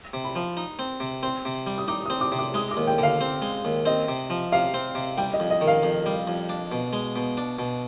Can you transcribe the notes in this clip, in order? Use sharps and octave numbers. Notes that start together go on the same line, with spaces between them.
C3
B5
F3
D#4
C4
C3
C4 C6
C3
G3
D#6
D#4 D6
D#6
C4
D6
C3
D6
G#3 D#6
D6
D#2
G5
D3 F5
C4
G#3
D#2
C4 D#5
C3
F3
C3 F5
C4
C3
G3 G5
D#5
F2
D#5
D#3
F5
F2
G3
F2
D4
B2
G#3
B2
D4
B2